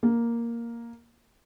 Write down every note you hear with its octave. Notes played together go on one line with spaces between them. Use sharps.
A#3